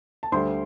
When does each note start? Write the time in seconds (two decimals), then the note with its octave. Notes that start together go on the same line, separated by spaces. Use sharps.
0.23 A5
0.32 D2 D3 G3 C5 C6